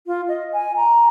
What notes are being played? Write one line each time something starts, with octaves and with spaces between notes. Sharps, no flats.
F4
D#5
G#5
A#5